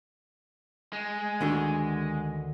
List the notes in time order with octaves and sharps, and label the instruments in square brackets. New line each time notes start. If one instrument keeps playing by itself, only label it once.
[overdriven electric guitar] G#3
[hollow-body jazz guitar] D2 D3 D#3